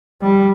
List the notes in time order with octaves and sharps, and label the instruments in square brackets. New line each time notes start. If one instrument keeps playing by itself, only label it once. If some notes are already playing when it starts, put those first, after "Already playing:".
[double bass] G3